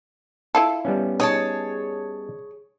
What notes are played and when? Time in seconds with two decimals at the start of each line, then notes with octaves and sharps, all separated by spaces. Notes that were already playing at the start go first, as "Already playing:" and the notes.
0.55 E4 F4 A4
0.85 G3 B3 C#4
1.20 D#4 G#4 C#5 A5